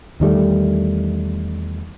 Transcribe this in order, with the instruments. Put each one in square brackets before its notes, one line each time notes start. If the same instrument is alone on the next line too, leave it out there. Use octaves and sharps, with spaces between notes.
[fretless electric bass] E2 D#3 G3 A3